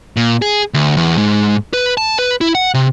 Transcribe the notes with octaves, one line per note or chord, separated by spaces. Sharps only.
A#2
G#4
D2
E2
G#2
B4
A5
B4
E4
F#5
C3